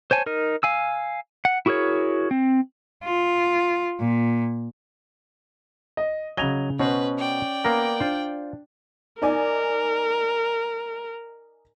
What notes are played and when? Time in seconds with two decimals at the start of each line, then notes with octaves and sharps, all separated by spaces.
0.11 C5 C#5 G#5 A5
0.26 D#4 A#4
0.63 F5 G#5 E6
1.45 F#5
1.66 E4 F#4 G#4 A#4 C#5
2.31 C4
3.04 F4
4.00 A#2
5.97 D#5
6.37 C#3 F#3 D#5 G#5 F7 G7
6.80 B2 C#4 F#4 B4 C5
7.18 D5 G5
7.64 A#3 B3 A#4
8.00 D4 F4 C5
9.22 D#4 A#4 D5 G#5